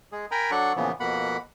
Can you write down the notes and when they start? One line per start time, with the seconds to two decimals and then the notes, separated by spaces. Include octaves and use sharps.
0.12 G#3 G#4
0.31 A#4 G5 G#5 A#5 B5
0.51 F#3 D4 A4 F#5 C#6
0.76 A#2 C#3 E3 F3 B3
1.00 F2 B2 A#3 F#5 B5